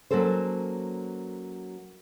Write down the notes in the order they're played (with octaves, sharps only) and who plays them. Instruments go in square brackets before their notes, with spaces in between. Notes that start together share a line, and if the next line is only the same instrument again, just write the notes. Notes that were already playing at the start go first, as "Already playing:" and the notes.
[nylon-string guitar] F#3 A#3 C#4 A4 C5